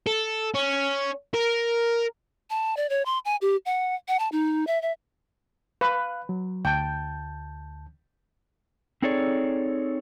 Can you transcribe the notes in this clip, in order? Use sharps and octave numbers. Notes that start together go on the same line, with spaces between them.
A4
C#4
A#4
A5
D5
C#5
C6
G#5
G4
F#5
F#5
A5
D#4
E5
E5
B4 F5 F#6
F#3
D2 G5 A5 G6
C4 D#4 G#4 A4 C#5 D5